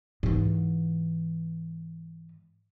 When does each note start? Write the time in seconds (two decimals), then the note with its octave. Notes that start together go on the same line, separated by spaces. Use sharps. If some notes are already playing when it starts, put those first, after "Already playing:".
0.23 G#2 E3